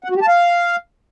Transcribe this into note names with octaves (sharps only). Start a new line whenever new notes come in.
F#5
F#4
G4
A5
F5